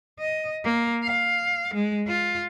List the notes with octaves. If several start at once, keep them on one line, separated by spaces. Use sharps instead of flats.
D#5
A#3
F5
G#3
F4